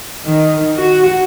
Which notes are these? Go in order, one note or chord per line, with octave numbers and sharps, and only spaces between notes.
D#3
F#4